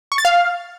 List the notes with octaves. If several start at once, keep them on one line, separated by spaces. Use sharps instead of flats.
C#6
A6
F5